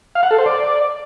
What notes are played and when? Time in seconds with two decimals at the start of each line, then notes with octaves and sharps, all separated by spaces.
0.15 F5
0.23 F#5
0.31 A4
0.38 C5
0.46 D5